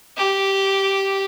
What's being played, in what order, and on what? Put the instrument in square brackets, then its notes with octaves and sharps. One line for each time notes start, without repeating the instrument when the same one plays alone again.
[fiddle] G4